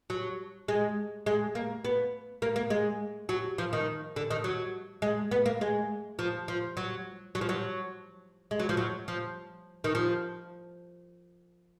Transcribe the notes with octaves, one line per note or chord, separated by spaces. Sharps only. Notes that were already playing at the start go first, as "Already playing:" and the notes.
F#3
G#3
G#3
A#3
B3
A#3
A#3
G#3
F#3
F3
D#3
D3
D#3
F#3
G#3
B3
A#3
G#3
F3
F3
F#3
F#3
F3
F#3
G#3
F#3
F3
F#3
F3
D#3
F3